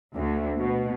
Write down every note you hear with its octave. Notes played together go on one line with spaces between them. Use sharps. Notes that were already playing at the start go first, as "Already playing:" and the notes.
D2
B2